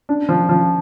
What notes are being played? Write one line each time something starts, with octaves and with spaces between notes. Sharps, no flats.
D4
F3
F3